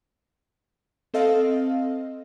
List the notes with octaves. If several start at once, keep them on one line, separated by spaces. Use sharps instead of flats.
C4 A4 D#5 F5